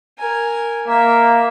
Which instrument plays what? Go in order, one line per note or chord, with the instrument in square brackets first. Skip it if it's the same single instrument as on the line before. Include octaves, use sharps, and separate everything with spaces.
[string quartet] A#4 G#5
[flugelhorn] A#3 [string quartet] E5